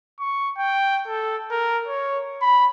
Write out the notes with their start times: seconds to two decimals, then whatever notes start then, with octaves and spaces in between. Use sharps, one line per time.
0.20 C#6
0.57 G5
1.08 A4
1.51 A#4
1.87 C#5
2.42 B5